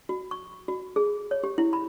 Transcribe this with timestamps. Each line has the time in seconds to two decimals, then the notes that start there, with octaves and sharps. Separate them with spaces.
0.09 F#4
0.31 C#6
0.68 F#4
0.96 G#4
1.31 C#5
1.44 G4
1.58 E4
1.73 B5